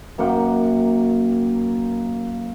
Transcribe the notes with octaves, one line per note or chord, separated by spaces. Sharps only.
F#2 A#3 F#5 G5